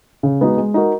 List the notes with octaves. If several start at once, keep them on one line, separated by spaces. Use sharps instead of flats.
C#3
G#3 B3 D#4 F#4
G#3
D#4 F#4 A#4